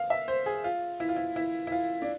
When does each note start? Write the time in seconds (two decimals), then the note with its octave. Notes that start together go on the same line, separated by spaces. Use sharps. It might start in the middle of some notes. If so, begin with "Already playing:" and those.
Already playing: F5
0.10 E5
0.28 C5
0.46 G#4
0.64 F4
1.00 E4
1.09 F4
1.16 E4
1.36 E4
1.67 E4
1.72 F4
2.02 D4